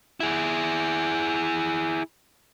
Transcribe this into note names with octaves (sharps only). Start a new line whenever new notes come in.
E4 G#4